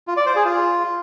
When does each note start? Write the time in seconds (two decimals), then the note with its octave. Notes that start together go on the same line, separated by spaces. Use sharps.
0.07 F4
0.17 D5
0.26 C5
0.36 G#4
0.45 F4